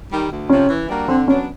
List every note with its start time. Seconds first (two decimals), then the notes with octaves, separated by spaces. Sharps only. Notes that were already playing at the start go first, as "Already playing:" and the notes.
0.10 D#3 G3
0.30 D2
0.49 C3 F3 C#4
0.69 E3
0.89 G3 A#3 D4 F#4
1.08 D3 C4
1.28 F#3 B3 C#4 D4